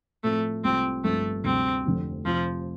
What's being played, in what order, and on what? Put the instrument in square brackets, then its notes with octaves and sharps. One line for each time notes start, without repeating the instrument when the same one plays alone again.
[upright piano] A2 F3 C4 [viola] A3
[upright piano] C2 C3 A3 F4 [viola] C4
[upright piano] G1 G2 F3 C4 F4 [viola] A3
[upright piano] D2 C3 G3 [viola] C4
[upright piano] F1 F2 D3
[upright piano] F1 F2 C3 [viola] F3